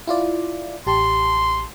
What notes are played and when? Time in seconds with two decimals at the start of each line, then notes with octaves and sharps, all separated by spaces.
0.07 E4 F4 D5
0.87 A1 G4 A5 C6